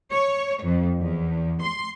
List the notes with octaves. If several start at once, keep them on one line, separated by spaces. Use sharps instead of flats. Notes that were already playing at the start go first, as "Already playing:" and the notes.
C#5
F2
E2
C6